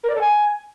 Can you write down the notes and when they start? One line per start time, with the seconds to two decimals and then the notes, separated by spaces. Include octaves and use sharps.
0.03 A#4
0.09 D5
0.15 A4
0.21 G#5